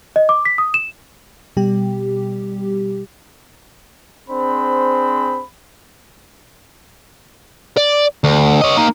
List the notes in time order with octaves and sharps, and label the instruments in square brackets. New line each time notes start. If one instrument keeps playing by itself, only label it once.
[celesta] D#5
D6
B6
D#6
E7
[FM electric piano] B2 G3 G4
[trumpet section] C4 D4 G#4 C5 B5
[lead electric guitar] D5
D2
C#5 D#5
A#3 D#4